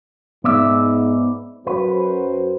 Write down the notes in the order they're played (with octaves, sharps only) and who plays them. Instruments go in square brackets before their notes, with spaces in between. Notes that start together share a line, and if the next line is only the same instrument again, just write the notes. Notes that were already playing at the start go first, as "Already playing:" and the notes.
[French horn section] G#2 [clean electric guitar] B3 D5 E5
[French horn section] F#2 F#4 C5 [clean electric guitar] B4